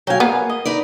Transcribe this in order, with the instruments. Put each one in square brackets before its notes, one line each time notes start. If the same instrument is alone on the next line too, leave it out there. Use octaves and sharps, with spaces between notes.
[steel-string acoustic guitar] F#3 F5 [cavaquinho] G5 G#5
[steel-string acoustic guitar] A#3 [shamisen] B3 [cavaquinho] F5 G#5
[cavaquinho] D#5
[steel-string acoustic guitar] D#4 B4 D5